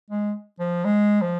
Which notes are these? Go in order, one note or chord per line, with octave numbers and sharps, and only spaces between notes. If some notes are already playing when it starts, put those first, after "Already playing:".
G#3
F3
G#3
F3